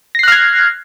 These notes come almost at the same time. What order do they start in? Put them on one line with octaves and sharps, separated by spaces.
A#6 C7 F#6 F6 G#6